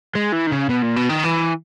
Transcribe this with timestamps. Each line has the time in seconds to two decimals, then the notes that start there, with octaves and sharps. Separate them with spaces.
0.15 G#3
0.32 E3
0.47 D#3
0.52 C#3
0.70 B2
0.82 A#2
0.96 B2
1.10 D#3
1.24 E3